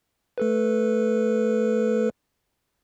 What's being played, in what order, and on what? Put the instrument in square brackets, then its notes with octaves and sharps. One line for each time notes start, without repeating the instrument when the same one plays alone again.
[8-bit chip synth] A3 A4 B4